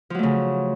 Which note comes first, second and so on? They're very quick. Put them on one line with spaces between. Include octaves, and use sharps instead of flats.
F3 F#3 A3 C#3